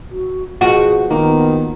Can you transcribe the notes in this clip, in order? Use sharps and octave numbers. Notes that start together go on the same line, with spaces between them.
F#4
B2 F3 F#4 G#4 F5
D#3 A#3 B3